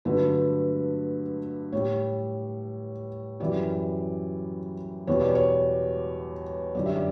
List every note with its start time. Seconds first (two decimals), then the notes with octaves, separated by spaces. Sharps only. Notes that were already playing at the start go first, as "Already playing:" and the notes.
0.05 G2 D3 F#3 A3 B4
1.72 A2 G3 C#5
3.40 F#2 E3 G3 D5
5.07 E2 B2 G3 C#5
5.21 D5
5.35 C#5
6.75 F#2 D3 G3 D5
6.86 E5
6.96 D5